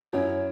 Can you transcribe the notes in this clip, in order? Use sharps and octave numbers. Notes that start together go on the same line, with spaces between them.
F#2 F#3 C#4 E4 C#5